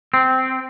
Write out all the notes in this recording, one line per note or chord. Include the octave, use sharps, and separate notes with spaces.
C4